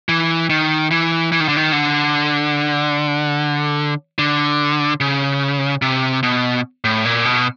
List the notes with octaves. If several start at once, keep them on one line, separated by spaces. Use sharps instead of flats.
E3
D#3
E3
E3
D#3
D3
D#3
D3
D3
C#3
C3
B2
A2
A#2
B2